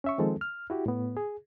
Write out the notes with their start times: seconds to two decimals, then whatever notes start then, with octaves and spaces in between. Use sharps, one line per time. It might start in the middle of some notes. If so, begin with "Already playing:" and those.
0.04 C#4 E5 C#6
0.18 D#3 F3 G#3 C4 A4
0.41 F6
0.70 E4 F#4 G4
0.86 A2 B3
1.17 G#4